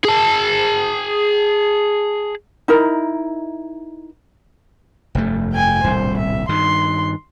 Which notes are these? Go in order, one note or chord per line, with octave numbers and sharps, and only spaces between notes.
G#4 A5
D#4 E4 A#4
F1 G2 A3
G5 G#5
D#1 C2 A2 C5
E5
G2 D#3 C6